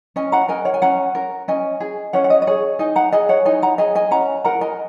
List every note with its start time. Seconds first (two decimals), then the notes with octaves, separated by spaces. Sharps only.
0.16 C#4 D#5 G#5
0.32 F#5 A#5
0.48 A#4 D#5 G#5
0.65 C#5 F#5
0.74 G#5
0.82 C#4 F#5 A#5
1.15 A#4
1.48 C#4 D#5 G#5
1.80 G#4
2.13 C#4 C#5 F#5
2.24 F#5
2.30 D#5
2.42 D#5
2.47 G#4 C#5
2.79 D#4 D#5 G#5
2.96 F#5 A#5
3.12 G#4 D#5 G#5
3.29 C#5 F#5
3.45 D#4 D#5 G#5
3.62 F#5 A#5
3.78 G#4 D#5 G#5
3.95 D#5 G#5
4.11 C#4 F#5 A#5
4.45 A#4 F#5 A#5
4.61 D#5 G#5